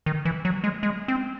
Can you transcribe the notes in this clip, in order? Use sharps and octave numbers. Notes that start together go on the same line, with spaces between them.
D#3
E3
F#3
G#3
G#3
C4